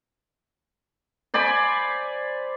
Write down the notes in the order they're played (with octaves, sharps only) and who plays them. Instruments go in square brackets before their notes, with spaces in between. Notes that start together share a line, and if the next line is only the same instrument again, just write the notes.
[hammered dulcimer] C5 D5 G#5 B5